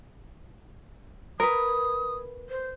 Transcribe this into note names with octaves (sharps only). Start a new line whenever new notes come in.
A#4 B4 D#6
C5